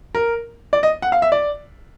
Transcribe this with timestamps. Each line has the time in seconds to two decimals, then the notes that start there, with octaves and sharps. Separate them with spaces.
0.15 A#4
0.73 D5
0.83 D#5
1.02 F#5
1.12 F5
1.22 E5
1.32 D5